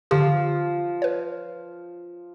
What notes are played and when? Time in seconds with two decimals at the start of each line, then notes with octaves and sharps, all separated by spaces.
0.11 D3 F3 G4
1.02 B4 C#5